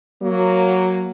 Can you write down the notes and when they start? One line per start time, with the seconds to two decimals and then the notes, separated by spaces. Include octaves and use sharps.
0.22 F#3 A#3